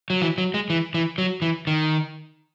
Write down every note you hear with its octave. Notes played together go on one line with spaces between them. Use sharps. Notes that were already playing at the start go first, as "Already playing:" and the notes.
F#3
E3
F#3
G#3
E3
E3
F#3
E3
D#3